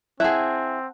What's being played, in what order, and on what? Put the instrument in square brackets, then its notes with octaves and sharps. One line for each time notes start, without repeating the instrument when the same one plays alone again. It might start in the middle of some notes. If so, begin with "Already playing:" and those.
[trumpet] C4 [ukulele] E4 G#4 [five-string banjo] E5 [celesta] F#5 A5 F#6